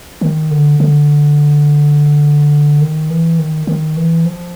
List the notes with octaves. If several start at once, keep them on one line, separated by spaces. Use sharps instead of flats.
D#3
D3
D3
D#3
E3
D#3
D#3
E3
F3